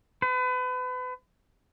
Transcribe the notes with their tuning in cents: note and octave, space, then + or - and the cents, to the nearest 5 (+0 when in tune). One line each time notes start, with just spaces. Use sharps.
B4 +35